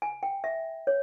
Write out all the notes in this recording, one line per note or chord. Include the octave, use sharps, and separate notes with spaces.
G#5
G5
E5
C#5